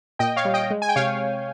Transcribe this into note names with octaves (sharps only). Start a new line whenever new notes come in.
A#2 D#5 G5
C#5 F5
G3
D#5 G5
G#3
G#5
G5
C3 C#5 F5